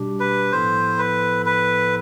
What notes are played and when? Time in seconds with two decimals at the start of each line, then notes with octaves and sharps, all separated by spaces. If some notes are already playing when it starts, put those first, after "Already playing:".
Already playing: B2 G3 D4 G4
0.20 B4
0.52 A2 F3 B3 E4 A4 C5
0.98 B4
1.46 B4